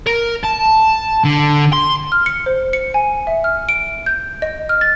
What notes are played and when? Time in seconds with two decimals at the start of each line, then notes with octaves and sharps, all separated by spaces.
0.07 A#4
0.43 A5
1.25 D3
1.73 C6
2.12 F6
2.26 C#7
2.46 C5
2.73 C#7
2.94 G#5
3.27 E5
3.44 F6
3.69 D7
4.06 G6
4.42 D#5
4.69 F6
4.81 A6